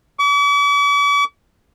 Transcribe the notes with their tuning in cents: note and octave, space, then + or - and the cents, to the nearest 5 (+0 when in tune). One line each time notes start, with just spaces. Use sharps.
D6 -45